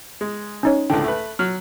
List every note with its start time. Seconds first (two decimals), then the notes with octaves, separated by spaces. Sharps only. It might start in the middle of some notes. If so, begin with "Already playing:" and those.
0.21 G#3
0.63 C#4 D#4 C#5
0.90 C#2 A2 D3 G5
1.04 A3 B4
1.39 F#3 F6